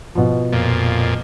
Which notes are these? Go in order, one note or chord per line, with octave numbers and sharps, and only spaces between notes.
B2 F3
F2 A#2